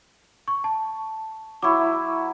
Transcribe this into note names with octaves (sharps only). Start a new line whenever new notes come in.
C#6
A5
F#3 E4 B5 C#6 D6